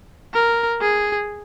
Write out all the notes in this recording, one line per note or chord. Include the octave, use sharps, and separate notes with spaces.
A#4
G#4